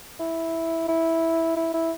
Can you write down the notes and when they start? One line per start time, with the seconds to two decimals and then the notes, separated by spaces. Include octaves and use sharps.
0.20 E4
0.88 E4
1.56 E4
1.74 E4